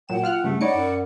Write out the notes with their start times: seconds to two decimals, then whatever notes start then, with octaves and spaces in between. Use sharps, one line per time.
0.09 A#2 F#3 F#5 G5 E7
0.24 F4 F6 F#6
0.44 G2 C#3 A3
0.61 D#4 C#5 D5 F#5 B5 D6 C#7
0.76 F#2